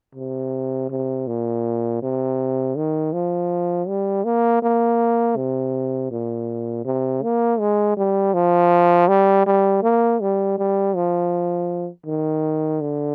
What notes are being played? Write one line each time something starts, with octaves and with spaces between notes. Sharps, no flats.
C3
C3
A#2
C3
D#3
F3
G3
A#3
A#3
C3
A#2
C3
A#3
G#3
G3
F3
G3
G3
A#3
G3
G3
F3
D#3
D3